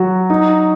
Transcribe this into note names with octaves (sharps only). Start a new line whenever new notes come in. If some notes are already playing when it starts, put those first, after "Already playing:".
Already playing: F#3 F#4
D#4